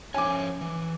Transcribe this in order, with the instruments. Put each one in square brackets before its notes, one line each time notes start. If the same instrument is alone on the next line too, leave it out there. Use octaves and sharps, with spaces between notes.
[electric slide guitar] F3 C#4 C#5 [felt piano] G#5 D6
[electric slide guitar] E3